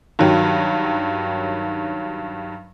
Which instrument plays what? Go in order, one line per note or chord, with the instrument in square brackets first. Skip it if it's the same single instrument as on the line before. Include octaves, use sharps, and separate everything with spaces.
[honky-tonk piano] G2 D#3 F#3